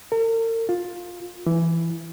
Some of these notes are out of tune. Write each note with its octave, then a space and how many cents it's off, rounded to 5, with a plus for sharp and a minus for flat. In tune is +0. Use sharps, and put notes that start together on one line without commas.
A#4 -45
F4 +15
E3 +15